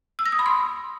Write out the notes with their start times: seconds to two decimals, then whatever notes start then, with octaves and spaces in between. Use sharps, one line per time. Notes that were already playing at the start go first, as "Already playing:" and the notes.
0.19 E6
0.26 A#6
0.32 D#6
0.39 B5
0.46 C6